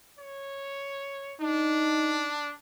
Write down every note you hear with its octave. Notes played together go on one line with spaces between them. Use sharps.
C#5
D4 D#4